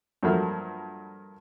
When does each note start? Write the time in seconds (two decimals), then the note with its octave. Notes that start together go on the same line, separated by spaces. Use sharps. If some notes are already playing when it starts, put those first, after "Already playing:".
0.23 G2 F3 F#3 A3 A#3